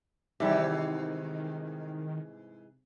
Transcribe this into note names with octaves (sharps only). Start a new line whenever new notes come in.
G#2 C3 D#3 E3 G3 G5